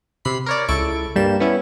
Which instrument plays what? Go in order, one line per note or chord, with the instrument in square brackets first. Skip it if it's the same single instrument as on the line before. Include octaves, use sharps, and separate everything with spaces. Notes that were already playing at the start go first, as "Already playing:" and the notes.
[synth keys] C3 B5 C7
A#4 C#5 D5
C#2 E4 A4 C#6 D7
G2 G3 A#3 E7
B3 C#4 E4